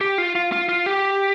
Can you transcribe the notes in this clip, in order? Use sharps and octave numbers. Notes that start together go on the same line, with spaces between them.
G4
F4
F4
F4
F4
G4